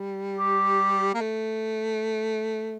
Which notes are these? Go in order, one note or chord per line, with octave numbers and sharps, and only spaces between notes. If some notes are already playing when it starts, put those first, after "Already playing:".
Already playing: G3
G4
A#3
A3